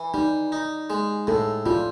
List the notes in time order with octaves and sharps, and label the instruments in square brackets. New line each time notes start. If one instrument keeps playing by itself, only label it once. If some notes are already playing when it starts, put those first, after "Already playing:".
Already playing: [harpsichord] E3
[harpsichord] G3 [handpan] D#4
[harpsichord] D#4
G#3
[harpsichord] A2 [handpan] A4
[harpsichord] G3 [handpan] F4